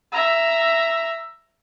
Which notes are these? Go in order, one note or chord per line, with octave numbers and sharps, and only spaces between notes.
E5 A#5